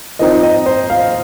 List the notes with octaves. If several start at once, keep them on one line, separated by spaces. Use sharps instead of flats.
F3 C4 D#4 D#5
D#5
C5
F5